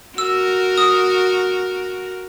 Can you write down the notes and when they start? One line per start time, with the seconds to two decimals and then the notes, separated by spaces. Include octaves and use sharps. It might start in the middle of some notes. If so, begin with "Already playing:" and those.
0.18 F#4 A#4 E6
0.78 D#6